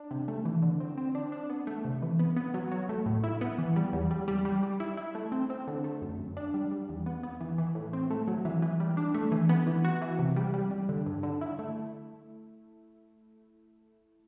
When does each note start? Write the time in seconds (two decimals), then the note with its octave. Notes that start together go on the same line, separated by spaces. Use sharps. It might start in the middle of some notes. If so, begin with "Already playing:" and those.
Already playing: D4
0.11 C3
0.28 A3
0.45 E3
0.62 D3
0.80 C4
0.98 C4
1.15 D4
1.32 D4
1.50 B3
1.67 A3
1.85 C3
2.02 E3
2.19 B3
2.37 B3
2.54 F#3
2.71 F#3
2.89 A3
3.06 A2
3.24 E4
3.41 B3
3.58 E3
3.76 G3
3.93 E2
4.11 G3
4.28 G3
4.45 G3
4.63 G3
4.80 E4
4.97 E4
5.15 A3
5.32 C4
5.50 C4
5.67 D3
5.84 A3
6.02 F#2
6.20 F#2
6.37 D4
6.54 G3
6.71 G3
6.89 E2
7.06 B3
7.23 B3
7.40 E3
7.58 E3
7.75 A2
7.93 C4
8.10 A3
8.28 F#3
8.45 E3
8.62 E3
8.80 G3
8.97 D4
9.14 A3
9.32 E3
9.49 B3
9.67 E3
9.84 F#4
10.02 E3
10.19 C3
10.36 G3
10.54 G3
10.71 G3
10.89 D3
11.06 G2
11.23 D3
11.41 E4
11.59 A3